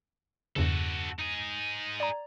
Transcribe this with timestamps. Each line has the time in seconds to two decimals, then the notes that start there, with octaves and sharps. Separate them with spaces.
0.56 E2 G2 C#3 F#4 A4
1.19 D#4 G#4
2.00 D5 A#5